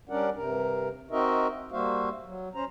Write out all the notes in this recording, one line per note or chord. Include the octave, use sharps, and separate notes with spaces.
G3 C#4 D4 A#4 D5 F#5
G2 C3 A#4
C4 D#4 F#4 A#4 D#5 E5
G3 A#3 F#4 C5 E5 F5
F#3
C#4 C5 A#5